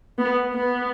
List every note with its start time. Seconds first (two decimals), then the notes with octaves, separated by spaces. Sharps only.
0.18 B3
0.54 B3